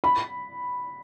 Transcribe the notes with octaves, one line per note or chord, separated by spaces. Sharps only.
B5